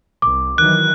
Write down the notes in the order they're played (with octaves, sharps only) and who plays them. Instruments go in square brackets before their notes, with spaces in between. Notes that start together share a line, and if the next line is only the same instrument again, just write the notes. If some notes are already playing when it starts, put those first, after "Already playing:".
[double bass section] C2 [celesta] D6
[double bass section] D#3 E3 F#3 [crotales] F#6